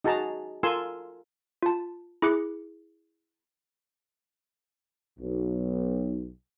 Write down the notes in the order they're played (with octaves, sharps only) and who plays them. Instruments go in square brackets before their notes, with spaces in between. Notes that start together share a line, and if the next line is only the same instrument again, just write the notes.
[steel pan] D#4 F#4 G#4 A5 A#5
F4 A4 A#4 G#5 C6 E6
[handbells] F4 A5
E4 G#4 D6 F#6 C#7
[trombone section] B1